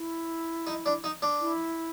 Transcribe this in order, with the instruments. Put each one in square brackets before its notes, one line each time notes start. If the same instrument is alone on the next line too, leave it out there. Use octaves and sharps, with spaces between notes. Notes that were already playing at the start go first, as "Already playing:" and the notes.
Already playing: [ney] E4
[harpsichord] D#4
D4
D#4
D4
[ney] E4